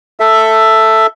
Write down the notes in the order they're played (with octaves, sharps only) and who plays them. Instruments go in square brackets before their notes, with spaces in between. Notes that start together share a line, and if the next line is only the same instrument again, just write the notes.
[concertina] A4 E5